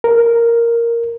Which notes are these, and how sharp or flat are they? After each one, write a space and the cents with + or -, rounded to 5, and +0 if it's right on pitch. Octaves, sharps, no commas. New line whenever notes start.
A#4 +0